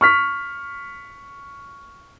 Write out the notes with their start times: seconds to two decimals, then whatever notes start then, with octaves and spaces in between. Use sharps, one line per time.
0.01 C#6 F6 B6